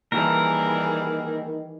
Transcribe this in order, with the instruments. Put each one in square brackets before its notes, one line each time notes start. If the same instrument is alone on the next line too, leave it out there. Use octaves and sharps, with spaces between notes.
[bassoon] D#3 [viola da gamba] E3 G3 G#4 [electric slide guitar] A#3 A5 [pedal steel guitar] A#4